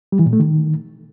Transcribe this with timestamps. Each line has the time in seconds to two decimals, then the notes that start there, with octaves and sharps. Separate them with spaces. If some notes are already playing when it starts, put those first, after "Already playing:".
0.12 G3
0.19 E3
0.26 A#2
0.33 A3
0.40 D#3